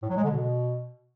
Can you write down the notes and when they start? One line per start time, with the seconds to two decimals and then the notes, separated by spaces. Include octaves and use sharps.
0.02 A2
0.09 F#3
0.17 G#3
0.24 D3
0.31 B2